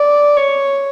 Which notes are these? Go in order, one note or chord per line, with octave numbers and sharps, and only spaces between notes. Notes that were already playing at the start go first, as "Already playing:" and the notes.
Already playing: D5
C#5